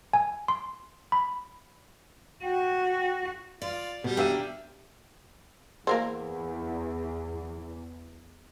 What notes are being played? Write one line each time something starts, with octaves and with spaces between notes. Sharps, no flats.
G#5
C6
B5
F#4 G5
F4 D5
B2 G3
A#3 D4 G4 E5 D#7
E2 A#3 A#4 C5